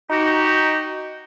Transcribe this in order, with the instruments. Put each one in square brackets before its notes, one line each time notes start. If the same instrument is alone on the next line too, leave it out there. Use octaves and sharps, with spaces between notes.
[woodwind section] D#4 F#4 G4